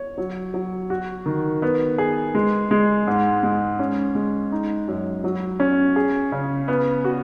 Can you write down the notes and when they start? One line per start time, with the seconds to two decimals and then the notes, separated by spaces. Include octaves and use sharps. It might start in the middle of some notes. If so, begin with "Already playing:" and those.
Already playing: C#5
0.18 F#3
0.54 F#3
0.90 F#4
1.26 D#3
1.62 B3
1.98 G#4
2.35 G#3
2.71 G#3
3.07 G#2
3.43 G#3
3.79 C#4
4.15 G#3
4.52 D#4
4.88 F#2
5.24 F#3
5.60 C#4
5.96 G#4
6.32 C#3
6.68 B3
7.04 F#4